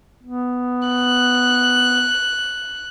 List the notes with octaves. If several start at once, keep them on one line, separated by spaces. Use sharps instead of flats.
B3
F#6